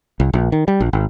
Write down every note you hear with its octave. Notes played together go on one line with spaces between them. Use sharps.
C2
A#1
D#3
G3
A#1
G#1